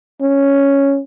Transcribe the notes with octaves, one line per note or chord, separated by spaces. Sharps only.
C#4